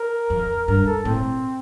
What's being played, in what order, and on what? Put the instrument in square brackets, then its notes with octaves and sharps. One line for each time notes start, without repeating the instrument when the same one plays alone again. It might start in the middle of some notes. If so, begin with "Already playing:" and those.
Already playing: [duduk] A#4
[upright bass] F2
[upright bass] G2 [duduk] A#4
[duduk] A4
[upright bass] A2 [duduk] C4